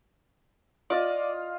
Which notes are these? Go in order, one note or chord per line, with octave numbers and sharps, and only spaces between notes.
F4 D5 D#5 F5